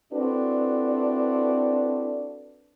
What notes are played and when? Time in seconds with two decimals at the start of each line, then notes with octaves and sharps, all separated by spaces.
0.13 C4 D4 E4 F#4 A4 B4